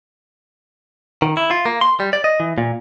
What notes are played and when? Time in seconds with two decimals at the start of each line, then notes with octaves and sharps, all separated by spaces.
1.22 D#3
1.37 E4
1.51 F4
1.66 A#3
1.81 C6
2.00 G3
2.13 D5
2.24 D#5
2.40 E3
2.58 A#2